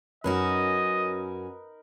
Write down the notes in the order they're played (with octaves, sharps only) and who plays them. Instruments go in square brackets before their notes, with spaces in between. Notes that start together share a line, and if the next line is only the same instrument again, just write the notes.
[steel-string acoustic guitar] F#2 C#4 F#4 [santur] D#4 A#4 B4 [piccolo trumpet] D#5